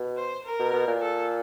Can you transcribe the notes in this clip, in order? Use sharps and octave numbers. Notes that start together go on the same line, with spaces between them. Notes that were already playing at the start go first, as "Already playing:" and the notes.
Already playing: B2
C5
A#4
B2
B2
A#2
A4